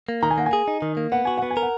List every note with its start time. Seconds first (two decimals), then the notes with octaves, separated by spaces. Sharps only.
0.09 A#3
0.23 D#3 A#5
0.31 G#5
0.38 A#3 F#5
0.46 G#5
0.53 G#4
0.68 D#4
0.82 D#3
0.97 A#3
1.12 B3 F#5
1.25 F#4 G#5
1.38 B3 F#5
1.51 G#5
1.57 A#4
1.62 F#5